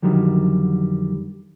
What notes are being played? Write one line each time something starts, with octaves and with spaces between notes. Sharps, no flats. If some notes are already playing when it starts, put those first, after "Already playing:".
F2 D3 D#3 F#3 G3